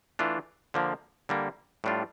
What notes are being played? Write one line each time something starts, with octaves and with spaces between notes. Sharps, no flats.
E3 A3 D4 F4
D3 F3 A#3
D3 G3 A#3
A2 G3 D4 F4